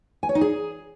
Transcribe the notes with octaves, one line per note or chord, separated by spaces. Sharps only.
G#5
C#5
D#4
G#4